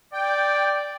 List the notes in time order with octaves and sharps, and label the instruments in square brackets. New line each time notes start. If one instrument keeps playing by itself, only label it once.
[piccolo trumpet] D5 [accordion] G5